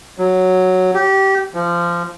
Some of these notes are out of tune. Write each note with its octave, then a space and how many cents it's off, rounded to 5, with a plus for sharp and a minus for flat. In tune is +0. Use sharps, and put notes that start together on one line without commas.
F#3 +0
G4 -20
F3 -20